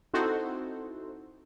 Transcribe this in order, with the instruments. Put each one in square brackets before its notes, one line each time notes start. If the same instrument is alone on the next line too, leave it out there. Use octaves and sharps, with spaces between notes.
[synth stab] C4 D#4 E4 F#4 A4 C5